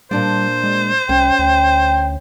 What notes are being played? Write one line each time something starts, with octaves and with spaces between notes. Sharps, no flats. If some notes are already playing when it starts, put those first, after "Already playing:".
A#2 G3 D4 C5 D5
G#3
C2 C#4 G5
D2 G5